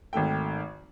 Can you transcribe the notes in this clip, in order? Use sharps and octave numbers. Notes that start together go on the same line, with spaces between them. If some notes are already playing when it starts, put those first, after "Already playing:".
G#1 D#3 A3 G5